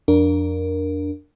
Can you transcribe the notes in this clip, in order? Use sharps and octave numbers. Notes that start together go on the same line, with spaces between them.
F2 D4 A#4